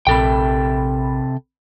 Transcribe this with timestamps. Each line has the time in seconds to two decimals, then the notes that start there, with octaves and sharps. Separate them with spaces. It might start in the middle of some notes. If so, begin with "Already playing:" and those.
0.07 A#1 C3 A4 G5 B5